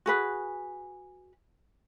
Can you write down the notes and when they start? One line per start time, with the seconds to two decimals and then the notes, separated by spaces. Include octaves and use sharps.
0.06 F#4 G#4 B4